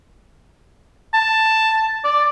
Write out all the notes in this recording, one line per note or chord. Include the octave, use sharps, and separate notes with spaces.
A5
D5